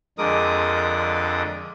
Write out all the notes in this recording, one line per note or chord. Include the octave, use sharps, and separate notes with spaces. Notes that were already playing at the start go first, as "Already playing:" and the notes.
F2 D3 G#3 A#4 D6 D#6